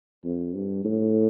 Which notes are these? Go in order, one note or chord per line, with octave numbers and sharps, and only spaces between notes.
F2
G2
A2